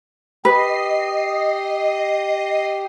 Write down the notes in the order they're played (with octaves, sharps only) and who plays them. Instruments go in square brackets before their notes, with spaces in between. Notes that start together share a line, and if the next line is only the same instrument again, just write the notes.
[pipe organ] G4 [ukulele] B4 [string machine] D#5 C7